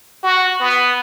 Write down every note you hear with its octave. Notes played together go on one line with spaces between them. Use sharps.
F#4
B3